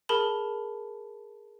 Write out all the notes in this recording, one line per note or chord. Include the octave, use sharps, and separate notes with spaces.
G#4 A#4 A5 B5 F#7